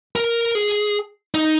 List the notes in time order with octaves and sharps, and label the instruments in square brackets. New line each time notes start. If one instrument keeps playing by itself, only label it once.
[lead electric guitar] A#4
G#4
D#4